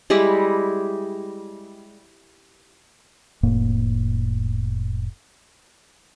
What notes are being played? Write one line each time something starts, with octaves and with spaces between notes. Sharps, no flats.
G3 G#3 E4 G4
F1 A2 A#3